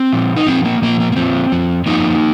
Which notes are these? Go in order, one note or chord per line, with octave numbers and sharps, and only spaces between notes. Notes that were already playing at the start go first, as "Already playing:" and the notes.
Already playing: C4
A#2 F3
D#4
A#2 F3 C4
A#3
A#2 F3 A#3
A#3
A#3
A#2 F3 C4
F2 F3
F2 F3 A#3 D#4